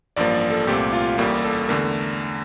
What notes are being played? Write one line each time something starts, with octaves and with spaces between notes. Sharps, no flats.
A1 G2 F3 A#3 D5
A4
C2 A#2 A3 C4 G4
F4
A1 A2 G3 A#3 G4
A4
E2 D3 A3 A#4